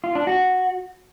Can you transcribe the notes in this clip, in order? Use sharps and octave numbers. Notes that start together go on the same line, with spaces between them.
F4
D4
F#4